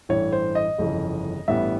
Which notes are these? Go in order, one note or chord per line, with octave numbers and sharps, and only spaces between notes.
A1 G2 E3 A3 C#5
C5
D#5
G1 F2 C#3 E3
A1 G2 E3 G3 B3 E5